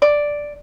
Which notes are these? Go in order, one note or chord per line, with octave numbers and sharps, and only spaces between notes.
D5